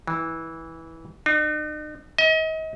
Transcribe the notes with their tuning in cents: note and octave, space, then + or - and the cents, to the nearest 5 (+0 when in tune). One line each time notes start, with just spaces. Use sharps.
E3 -15
D#4 -45
D#5 +35